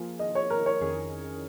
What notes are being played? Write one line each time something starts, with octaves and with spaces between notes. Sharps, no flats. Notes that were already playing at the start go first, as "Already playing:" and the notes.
Already playing: F3 A#3 F4 G#4
D#5
C#5
A#4
C#5
F2 D#3 C#4 G#4